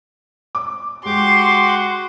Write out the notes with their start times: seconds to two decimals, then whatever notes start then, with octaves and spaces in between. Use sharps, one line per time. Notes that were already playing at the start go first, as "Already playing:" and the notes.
0.55 D6
1.06 G#3 F#4 G4 C6 D6